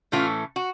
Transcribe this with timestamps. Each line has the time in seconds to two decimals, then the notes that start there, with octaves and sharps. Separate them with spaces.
0.12 A2 E3 A3 C#4 F4
0.56 F#4